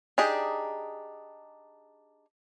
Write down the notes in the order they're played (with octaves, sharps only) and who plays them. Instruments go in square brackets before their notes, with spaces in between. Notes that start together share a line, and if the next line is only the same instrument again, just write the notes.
[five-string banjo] D4 D#4 G4 G#4